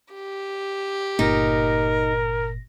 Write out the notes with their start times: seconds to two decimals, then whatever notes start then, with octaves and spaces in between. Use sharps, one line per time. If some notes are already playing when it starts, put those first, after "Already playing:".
0.14 G4
1.19 G1 A#2 D#4 A#4 A#6